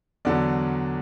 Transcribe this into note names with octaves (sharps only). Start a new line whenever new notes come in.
E2 D3 F#3 D5